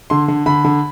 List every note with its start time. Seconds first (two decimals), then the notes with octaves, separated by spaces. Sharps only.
0.10 D3 C6
0.28 D3
0.46 D3 B5
0.64 D3